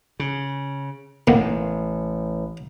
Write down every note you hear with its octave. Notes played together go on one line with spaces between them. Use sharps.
C#3
A1 D#3 A#3 B3